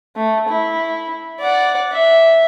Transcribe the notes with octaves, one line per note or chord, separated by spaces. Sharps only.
A3
E4
D5 F#5
E5